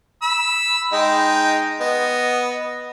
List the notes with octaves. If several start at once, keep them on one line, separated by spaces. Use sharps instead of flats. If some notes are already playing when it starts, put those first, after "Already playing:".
B5 E6
G#3 D#4 G5
B3 D#5